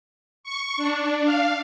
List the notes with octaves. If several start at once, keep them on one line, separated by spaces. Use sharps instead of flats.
C#6
D4
F5